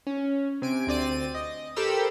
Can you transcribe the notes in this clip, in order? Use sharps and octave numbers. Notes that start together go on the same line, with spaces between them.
C#4
C3 G#5 D7
D2 C4 D5 D#7
D#5
G4 A4 A#4 C5 B5 E6